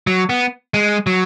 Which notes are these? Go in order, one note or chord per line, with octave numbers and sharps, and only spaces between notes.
F#3
B3
G#3
F#3